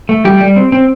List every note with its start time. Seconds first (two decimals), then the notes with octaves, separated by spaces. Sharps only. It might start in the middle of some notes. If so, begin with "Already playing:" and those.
0.09 A3
0.25 G3 G4
0.41 G3
0.56 C4
0.72 C4